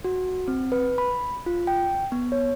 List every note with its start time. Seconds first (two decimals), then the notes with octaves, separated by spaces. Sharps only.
0.04 F#4
0.48 C4
0.72 B4
0.98 B5
1.46 F4
1.67 G5
2.12 B3
2.32 C#5